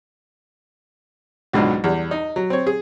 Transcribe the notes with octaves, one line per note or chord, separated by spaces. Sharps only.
C#2 G#2 B2 D3 F#3
E2 G3
D#4
F#3
C4 C#5
G#4